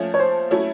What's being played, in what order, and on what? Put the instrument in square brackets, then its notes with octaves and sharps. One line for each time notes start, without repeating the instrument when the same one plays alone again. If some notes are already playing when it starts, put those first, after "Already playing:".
Already playing: [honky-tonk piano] F3 A3 C#4
[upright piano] C#5
C5
[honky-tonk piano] F#3 A3 C#4 E4